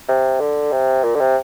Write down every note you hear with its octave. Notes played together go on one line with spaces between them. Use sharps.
C3
D3
C3
A#2
D3
C3